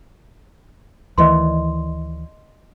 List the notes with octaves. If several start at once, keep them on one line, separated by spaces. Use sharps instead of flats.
D2 D#3 E3 D5 D#5 C6